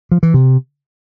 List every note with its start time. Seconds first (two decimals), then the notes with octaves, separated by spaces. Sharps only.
0.12 F3
0.23 E3
0.34 C3